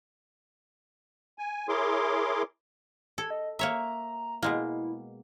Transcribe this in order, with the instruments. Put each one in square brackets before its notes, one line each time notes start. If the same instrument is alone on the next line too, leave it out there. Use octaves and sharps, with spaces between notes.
[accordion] G#5
E4 G#4 A#4 C#5 C6 D6
[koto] A4 [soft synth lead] G#6
[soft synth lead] D#5
[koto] A#3 C#5 E5 [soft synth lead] A#5
[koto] B2 G#3 A#3 [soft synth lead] E4